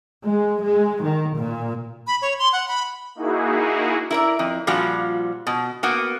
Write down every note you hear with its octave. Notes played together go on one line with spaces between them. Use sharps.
G#3
G#3
D#3
A#2
B5
C#5
C6
F#5
B5
A#3 D#4 E4 F#4 G#4
E4 A#4 D5
F2
A#2 F3 G3 F4 F#4
B2
A#3 B3 F#4